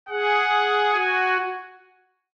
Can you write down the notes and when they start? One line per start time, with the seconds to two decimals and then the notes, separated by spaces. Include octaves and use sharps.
0.09 G#4 F#5
0.93 F#4 G#5